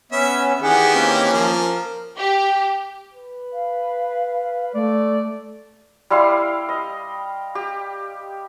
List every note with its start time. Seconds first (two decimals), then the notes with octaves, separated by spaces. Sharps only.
0.12 B3 C#4 E5
0.62 D#3 E3 G4 G#4 F#5
0.95 A#3 C4 C#4
1.33 F3 A#4
2.18 G4
3.13 B4
3.53 F5
4.74 A3 D5
6.10 G3 E4 F5 C6
6.69 D#5
7.55 G4